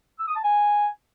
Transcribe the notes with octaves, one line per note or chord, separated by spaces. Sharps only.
E6
D#6
A5
G#5